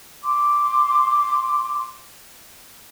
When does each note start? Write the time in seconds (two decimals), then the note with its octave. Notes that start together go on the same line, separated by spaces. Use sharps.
0.23 C6 D6